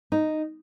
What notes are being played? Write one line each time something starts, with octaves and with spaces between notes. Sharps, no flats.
D#4